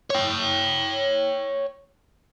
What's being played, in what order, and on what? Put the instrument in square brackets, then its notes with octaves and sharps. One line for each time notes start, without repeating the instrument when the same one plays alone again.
[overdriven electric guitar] C#5 G5